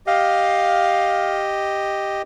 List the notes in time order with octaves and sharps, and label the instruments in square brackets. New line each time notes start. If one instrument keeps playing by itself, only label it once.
[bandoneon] G4 D#5 [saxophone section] F5